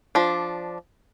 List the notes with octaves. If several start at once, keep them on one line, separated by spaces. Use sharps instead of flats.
F3 D4